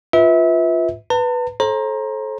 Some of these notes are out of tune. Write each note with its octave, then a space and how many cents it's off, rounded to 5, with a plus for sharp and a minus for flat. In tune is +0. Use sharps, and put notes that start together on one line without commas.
F4 +0 B4 +0 E5 -30
B4 +0 A5 +45
A4 -25 C5 +35 A#5 +10